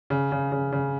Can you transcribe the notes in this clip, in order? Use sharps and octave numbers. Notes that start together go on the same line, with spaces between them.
C#3
C#3
C#3
C#3